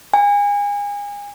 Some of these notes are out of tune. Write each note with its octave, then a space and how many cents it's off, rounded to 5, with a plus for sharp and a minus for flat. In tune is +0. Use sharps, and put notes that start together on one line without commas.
G#5 -30